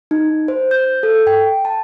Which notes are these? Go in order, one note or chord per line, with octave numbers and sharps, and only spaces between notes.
D#4
C5
G6
A4
G5
A5